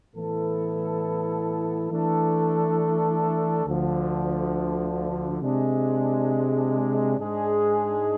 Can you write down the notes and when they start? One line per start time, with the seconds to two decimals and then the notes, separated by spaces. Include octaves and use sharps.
0.15 A2 E3 B3 E4 A4
1.90 E3 A3 D4 A4
3.66 D2 D3 F3
5.42 C3 G#3 D4
7.18 G#2 G#3 D4 G#4